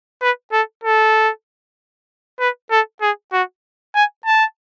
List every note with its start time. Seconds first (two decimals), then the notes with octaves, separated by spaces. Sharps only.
0.22 B4
0.52 A4
0.83 A4
2.40 B4
2.71 A4
3.02 G#4
3.33 F#4
3.95 G#5
4.26 A5